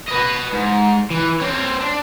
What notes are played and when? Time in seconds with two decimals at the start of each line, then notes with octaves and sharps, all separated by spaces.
0.08 B4 D#5
0.52 G#2
1.10 E3
1.40 C4 C#5
1.80 D4